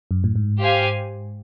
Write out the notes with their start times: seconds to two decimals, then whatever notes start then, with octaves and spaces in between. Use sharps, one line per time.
0.11 F#2
0.24 A2
0.36 G#2
0.60 G4 C5 F5 G#5